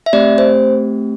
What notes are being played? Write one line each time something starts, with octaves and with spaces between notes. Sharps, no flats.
E5
A3 C4 G4 D5
C5